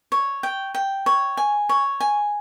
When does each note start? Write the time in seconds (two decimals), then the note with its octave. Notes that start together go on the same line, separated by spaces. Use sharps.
0.12 C#5
0.43 G5
0.75 G5
1.06 C#5
1.37 G#5
1.69 C#5
2.00 G#5